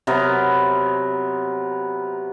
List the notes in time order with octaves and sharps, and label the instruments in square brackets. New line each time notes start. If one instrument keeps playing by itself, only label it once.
[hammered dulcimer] C3 F#3 B3 A#4